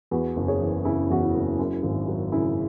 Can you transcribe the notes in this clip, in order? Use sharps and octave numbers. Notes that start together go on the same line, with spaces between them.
E2 F#4 B4
F#1
G#4 C#5
E3
C#3 E4
E2 F#4
E4
F#1
F#2
G#1
F#3
C#3 E4